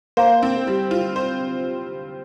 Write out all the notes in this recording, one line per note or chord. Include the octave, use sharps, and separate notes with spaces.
A#3 C5
C4
G3
F4
C5